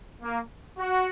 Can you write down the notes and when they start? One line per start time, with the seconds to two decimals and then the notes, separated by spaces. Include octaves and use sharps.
0.23 A#3
0.78 F#4